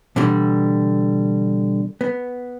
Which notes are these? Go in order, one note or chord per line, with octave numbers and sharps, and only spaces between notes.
B2 D3 E3 G3
B3